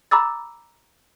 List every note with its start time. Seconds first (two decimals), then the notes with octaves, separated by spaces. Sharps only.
0.11 A#5 B5 D6 E6 A6